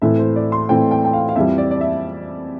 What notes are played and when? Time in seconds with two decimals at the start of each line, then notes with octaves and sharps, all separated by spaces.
0.02 A2 E3 A3 C4 E5
0.19 C5
0.36 D5
0.52 C6
0.69 A2 E3 A3 C4 G5
0.91 G5
1.05 G5
1.13 F5
1.29 F5
1.35 F2 E3 G3 E5
1.58 D5
1.71 D5
1.81 E5